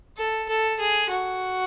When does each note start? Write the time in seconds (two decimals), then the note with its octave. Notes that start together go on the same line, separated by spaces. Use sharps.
0.18 A4
0.49 A4
0.80 G#4
1.10 F#4